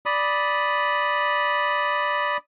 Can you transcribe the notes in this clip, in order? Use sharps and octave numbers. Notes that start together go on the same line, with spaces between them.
D5 B5 D#6